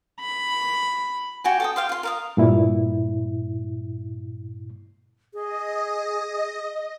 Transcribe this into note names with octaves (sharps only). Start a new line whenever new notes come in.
B5
F#4 G4 G#5
A4 G5 D#6
G4 F5 C6
F4 C6
A#4 F5 D#6
G2 A#2 E4
G#4 D#5